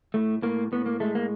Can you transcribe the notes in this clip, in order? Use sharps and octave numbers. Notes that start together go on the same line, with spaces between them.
A2 A3
A2 A#3
A2 B3
A#3
G#3 A3
A#3